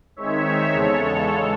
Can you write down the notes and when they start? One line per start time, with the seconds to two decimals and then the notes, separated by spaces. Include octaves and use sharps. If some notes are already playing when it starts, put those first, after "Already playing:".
0.16 D#3 G#3 C4 D#4 C#5 E5
0.72 E2 C#3 G#3 A4 C#5